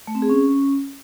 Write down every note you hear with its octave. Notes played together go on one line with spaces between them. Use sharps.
A3
C4
G#4
C#4